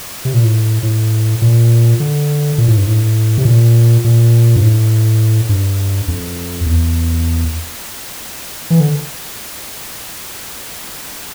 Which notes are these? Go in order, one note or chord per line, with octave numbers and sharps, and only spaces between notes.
C3
A#2
A2
A2
A#2
D3
A#2
A2
G2
A2
C3
A#2
A#2
G2
A2
G2
F2
E2
E3
D3